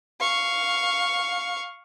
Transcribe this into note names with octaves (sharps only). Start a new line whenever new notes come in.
F5 C#6